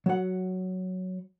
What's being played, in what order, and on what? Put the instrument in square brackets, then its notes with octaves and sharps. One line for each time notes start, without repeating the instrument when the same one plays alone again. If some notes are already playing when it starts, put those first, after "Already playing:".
[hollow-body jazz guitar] F#3 F#5